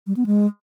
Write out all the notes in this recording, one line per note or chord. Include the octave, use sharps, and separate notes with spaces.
G3
B3
G#3